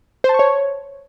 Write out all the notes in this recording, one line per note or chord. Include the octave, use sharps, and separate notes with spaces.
C5
A5
C#6
C#5